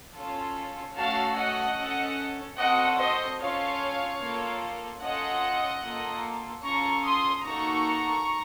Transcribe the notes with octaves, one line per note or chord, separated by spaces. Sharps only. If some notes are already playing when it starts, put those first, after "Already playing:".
C#4 F4 A4
A3 C#4 F#4 A4 F5 A5
D#5 F#5
C#4 A4
C4 F#4 A4 D#5 F#5
C5 D#5
C#4 F4 A4 C#5 F5
A#3 F4 A4
C#4 F4 A4 D#5 F#5
A#3 F4 A4
C#4 F4 A4 A#5 C#6
C6 D#6
A#3 D#4 F#4 A4 A#5 C#6